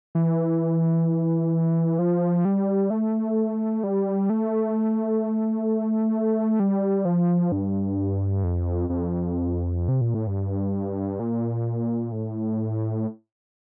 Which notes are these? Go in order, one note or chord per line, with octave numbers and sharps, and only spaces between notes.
E3
F3
G3
A3
G3
A3
G3
F3
G2
F2
F2
C3
A#2
A2
G2
A#2
A2